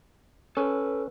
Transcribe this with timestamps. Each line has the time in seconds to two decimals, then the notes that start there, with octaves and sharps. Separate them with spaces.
0.57 C#4 A4 B4